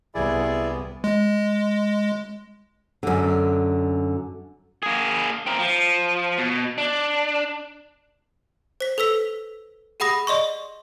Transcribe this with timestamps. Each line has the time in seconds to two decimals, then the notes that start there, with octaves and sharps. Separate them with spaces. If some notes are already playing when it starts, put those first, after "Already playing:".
0.15 C2 B3 E4 G#4 D5
1.04 G#3
3.03 F#2 D3
4.83 A#3 G#4
5.46 C4 A#4
5.59 F3
6.38 B2
6.78 D4
8.81 C5 B6
8.98 A4 B4 E6 B6
10.00 G4 G#4 F#5 B5 D#6 A#6
10.27 D5 D#5 C6 C#6